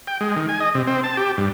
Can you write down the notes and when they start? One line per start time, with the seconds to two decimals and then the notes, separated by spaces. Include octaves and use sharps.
0.07 G5
0.21 G#3
0.36 D#3
0.49 G#5
0.60 D#5
0.75 C3
0.87 C4
1.04 A5
1.17 G4
1.37 G2